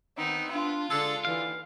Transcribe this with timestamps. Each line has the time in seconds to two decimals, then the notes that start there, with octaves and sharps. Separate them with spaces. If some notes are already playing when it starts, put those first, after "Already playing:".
0.17 D#3 B3 C4 D#4
0.52 D4 F4
0.90 D3 G#3 D4 A4
1.25 D#2 D3 E3 F5